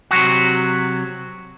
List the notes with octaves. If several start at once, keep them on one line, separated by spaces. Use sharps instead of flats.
C3 F#3 F#4